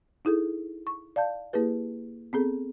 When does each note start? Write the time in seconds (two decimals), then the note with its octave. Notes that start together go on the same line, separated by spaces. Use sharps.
0.25 D#4 E4 G#4 A4
0.87 C#6
1.16 D5 F5 A5 G6
1.53 A#3 E4 G4 G#4 B4
2.33 B3 C4 G#4 A4